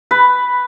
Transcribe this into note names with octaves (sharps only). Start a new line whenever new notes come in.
B4